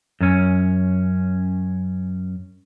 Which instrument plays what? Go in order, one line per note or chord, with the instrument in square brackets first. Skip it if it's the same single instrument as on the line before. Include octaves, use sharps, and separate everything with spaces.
[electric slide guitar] F#2 C#4